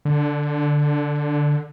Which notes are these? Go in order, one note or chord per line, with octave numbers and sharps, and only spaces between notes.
D3